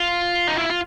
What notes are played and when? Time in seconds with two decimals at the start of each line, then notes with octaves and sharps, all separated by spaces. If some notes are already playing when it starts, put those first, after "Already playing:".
Already playing: F4
0.48 D#4
0.58 E4
0.70 F4